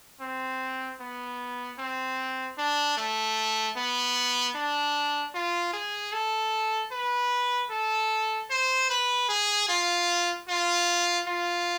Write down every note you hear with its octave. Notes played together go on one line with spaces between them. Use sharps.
C4
B3
C4
D4
A3
B3
D4
F4
G#4
A4
B4
A4
C5
B4
G#4
F4
F4
F4